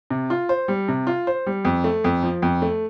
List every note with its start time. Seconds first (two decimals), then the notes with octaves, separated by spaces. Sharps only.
0.11 C3
0.30 F4
0.49 C5
0.68 G3
0.88 C3
1.07 F4
1.27 C5
1.46 G3
1.65 F2
1.84 A3
2.04 F2
2.23 F3
2.42 F2
2.62 A3